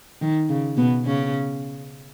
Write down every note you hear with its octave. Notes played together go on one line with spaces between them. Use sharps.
D#3
C#3
B2 B3
C#3 C#4